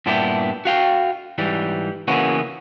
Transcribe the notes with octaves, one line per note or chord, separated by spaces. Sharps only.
G2 A#2 B3 D4 E4 G4
F#4 F5 G5
G#2 E3 G3
C#3 E3 A#3 B3 C#4 F#4